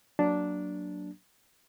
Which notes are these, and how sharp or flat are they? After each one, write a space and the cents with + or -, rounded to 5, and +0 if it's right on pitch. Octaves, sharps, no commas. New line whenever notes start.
F#3 +0 A#3 +0 D4 -5